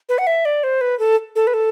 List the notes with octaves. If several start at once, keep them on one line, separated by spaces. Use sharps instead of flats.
B4
F#5
E5
D5
C5
B4
A4
A4
B4
A4